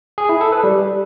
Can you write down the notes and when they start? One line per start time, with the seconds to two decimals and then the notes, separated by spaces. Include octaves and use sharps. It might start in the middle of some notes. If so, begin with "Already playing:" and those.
0.18 G#4
0.29 E4
0.41 A4
0.52 B4
0.64 G3